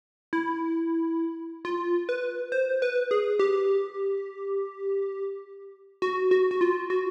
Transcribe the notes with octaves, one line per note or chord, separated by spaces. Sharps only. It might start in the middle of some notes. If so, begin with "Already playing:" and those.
E4
F4
B4
C5
B4
G#4
G4
F#4
F#4
F#4
F4
F#4